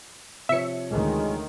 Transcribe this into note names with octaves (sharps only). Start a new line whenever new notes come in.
C3 F3 C#5 E5 C#7
D2 D#3 G#3